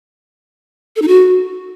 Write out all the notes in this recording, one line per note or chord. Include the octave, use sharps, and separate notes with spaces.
A4
D#4
F#4